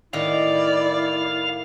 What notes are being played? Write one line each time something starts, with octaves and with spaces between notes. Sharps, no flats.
A2 D#3 E4 D5 F5